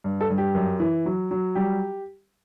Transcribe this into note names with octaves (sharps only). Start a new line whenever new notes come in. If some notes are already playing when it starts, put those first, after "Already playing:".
G2
A4
G2
G4
F#2
E3
F#3
F#3
G3 G4